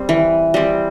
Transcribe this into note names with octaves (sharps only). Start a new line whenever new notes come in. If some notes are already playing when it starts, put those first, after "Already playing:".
Already playing: G3 C4
E3
G3 C4